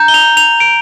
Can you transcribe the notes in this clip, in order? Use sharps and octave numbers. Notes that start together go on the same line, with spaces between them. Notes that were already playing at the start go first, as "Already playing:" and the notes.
Already playing: A#5 G6
G7
F7
F7
D7